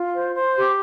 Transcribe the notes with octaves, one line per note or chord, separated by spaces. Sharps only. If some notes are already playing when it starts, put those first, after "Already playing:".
Already playing: F4
C5
C5
G4